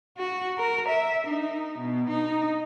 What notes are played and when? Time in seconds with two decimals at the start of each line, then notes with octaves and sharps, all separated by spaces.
0.17 F#4
0.58 A#4
0.89 E5
1.27 D#4
1.79 B2
2.10 D#4